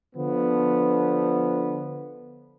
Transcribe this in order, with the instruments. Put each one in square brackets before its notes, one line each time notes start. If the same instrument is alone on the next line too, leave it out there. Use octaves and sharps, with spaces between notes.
[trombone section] D3 F3 B3